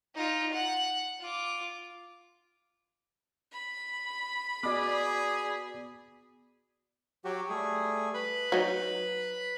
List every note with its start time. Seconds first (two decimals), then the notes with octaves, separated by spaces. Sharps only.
0.15 D#4 F4
0.53 F#5
1.20 F4 D6
3.52 B5
4.63 B3 F#4 G#4 D5 D6
7.25 F#3 F#4 G4
7.49 G3 A3 G#4
8.14 B4 B5
8.52 F#3 D#4